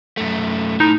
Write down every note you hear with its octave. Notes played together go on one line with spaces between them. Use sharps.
F#2 A3
A2 D#4